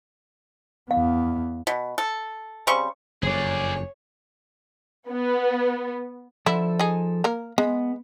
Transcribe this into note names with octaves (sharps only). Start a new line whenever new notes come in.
E2 B3 F5
B2
A4
C#3 G3 C4 C#6
F#1 F2 G#4 C#5 D5
B3
D3 F3 E4 A4
D#4 G#4
A#3 A#4
G#3 B3